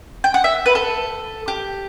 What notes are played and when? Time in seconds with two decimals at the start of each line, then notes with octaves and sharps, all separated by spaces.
0.24 G5
0.34 F#5
0.44 E5
0.66 B4
0.75 A4
1.48 G4